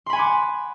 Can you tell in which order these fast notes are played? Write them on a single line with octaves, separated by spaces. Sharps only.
C6 B5 G#5 F#5 D6